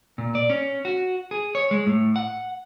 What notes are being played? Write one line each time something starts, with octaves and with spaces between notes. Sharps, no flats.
A#2
D5
C#4
F#4
G#4
C#5
G#3
A2
F#5